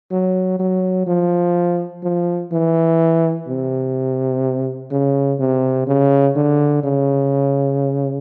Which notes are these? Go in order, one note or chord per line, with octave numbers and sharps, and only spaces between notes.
F#3
F#3
F3
F3
E3
C3
C#3
C3
C#3
D3
C#3